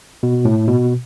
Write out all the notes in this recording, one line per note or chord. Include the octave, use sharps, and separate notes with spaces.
B2
A2
B2